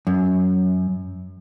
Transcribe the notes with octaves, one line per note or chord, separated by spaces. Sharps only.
F#2